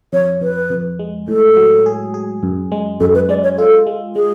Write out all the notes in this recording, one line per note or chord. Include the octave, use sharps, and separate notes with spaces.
F2 C#5
F2 B4
F2
G#3
A2 A4
F#3
G#4
G#4
F#2
G#3
F#2 A4
B4
G#3 D5
C#5
F4 A4
G#3
G#3 G#4